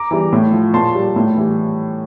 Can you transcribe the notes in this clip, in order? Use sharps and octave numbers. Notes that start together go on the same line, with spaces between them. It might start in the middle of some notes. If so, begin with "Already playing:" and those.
Already playing: A#5 D6
E3 G3
A2
F3
A#2 A5 C6
G3
A2
E3 G3